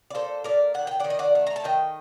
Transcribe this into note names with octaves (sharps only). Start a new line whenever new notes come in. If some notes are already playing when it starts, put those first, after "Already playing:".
D5
A#2 A4 C5
A#2 A#4 D5
D#3 F#5
G5
D#3 D5 F#5
D#5
D5 F#5
A3
A#5
A5
D#3 D#5 G5